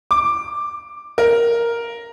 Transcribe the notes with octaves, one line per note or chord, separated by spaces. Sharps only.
D6
A#4